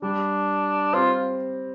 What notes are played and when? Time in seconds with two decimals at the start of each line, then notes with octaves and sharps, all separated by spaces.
0.02 G3 D4
0.93 C4 F4